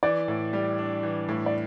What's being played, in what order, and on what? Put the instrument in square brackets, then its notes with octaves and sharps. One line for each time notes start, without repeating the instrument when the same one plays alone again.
[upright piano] E3 [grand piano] D5
[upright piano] A2
G3
D4
E3
A2
[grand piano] D5